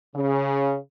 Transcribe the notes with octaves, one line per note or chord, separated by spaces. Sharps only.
C#3